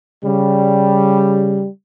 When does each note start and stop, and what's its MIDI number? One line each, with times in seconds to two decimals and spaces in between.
0.25 1.67 49
0.25 1.67 55